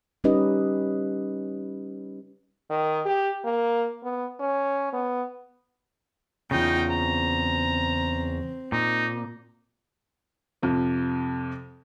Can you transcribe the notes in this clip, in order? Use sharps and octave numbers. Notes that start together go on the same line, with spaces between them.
G3 C#4 D#4 G4 B4 D#5
D#3
G4
A#3
B3
C#4
B3
E2 C#3 D#4 F4 G5
C4 A#5
A#2 D#4
F2 C3 F3